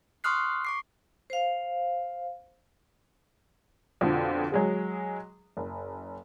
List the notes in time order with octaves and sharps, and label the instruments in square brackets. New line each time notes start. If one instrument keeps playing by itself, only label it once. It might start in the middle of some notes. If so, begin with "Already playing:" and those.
[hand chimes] C6 C#6 D#6 F6 F#6 C7
C#6 D6 C7
[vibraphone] C5 F5
[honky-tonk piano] F2 B2 D3 F3
F#3 G#3 G#4
F#1